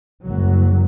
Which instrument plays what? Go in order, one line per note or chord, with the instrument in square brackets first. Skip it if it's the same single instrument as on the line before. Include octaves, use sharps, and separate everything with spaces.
[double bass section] F#1 C2 F#3